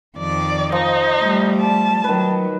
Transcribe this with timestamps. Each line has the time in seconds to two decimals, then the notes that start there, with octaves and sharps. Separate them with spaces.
0.18 F2 D#3 D5
0.72 F3 D#4
1.22 G3 A3
1.61 A5
2.04 D#3 F#3 B4